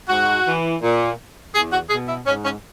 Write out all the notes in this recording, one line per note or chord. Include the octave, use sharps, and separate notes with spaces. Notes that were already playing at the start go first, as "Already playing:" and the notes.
G#2 F#4
E3
A#2
E2 G#4
F#4
B2 G#4
E4
G#2 C#4
C#4